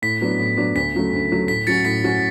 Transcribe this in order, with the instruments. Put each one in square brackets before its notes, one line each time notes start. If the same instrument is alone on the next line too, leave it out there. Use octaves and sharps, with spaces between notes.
[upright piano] A2 [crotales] B6
[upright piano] F#3 B3 D4
A2
F#3 B3 D4
[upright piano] D2 [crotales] B6
[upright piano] C#3 F#3 A3
D2
C#3 F#3 A3
[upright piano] A2 [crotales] B6
[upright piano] F#3 C#4 F#4 [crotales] A6 C#7
[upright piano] A2 [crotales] B6
[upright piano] F#3 C#4 F#4